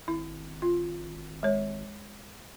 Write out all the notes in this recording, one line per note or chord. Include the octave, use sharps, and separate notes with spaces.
G#1 E4
F4
G#3 C#5